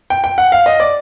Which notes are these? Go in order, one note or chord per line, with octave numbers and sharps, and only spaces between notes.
G5
G5
F#5
F5
D#5
D5